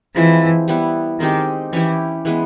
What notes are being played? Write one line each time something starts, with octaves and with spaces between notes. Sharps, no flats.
E3 F3 G#3 C4 E4
G3 B3 E4
D#3 G#3 C4 D#4 G4
E3 C#4 E4 G4
E3 G#3 B3